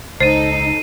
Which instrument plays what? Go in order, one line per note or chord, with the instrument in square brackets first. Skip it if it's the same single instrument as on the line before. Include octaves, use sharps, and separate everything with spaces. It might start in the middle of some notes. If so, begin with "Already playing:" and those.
[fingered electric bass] C#2 [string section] D#4 A4 [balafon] C5 [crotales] C7 D#7